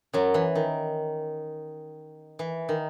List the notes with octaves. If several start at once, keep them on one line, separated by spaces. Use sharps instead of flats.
F#2 F#3
E3
D#3
E3
D#3